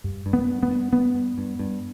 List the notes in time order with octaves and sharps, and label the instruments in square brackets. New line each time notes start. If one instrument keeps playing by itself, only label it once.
[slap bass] G2
G2
B3
G2
B3
G2
G2 B3
G2
G2
G2